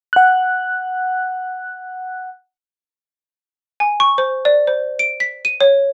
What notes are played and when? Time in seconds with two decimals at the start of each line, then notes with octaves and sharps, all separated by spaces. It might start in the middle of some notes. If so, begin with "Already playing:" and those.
0.13 F#5 F#6
3.80 G#5
4.00 C#6
4.18 C5
4.45 D5
4.67 C5
4.99 D7
5.20 B6
5.45 D#7
5.61 C#5